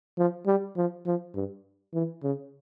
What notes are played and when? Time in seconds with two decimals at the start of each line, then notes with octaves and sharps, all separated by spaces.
0.18 F3
0.46 G3
0.77 F3
1.06 F3
1.35 G2
1.94 E3
2.23 C#3